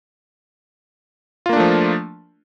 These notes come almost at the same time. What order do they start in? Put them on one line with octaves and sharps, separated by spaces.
F4 A#3 D4 A3 F3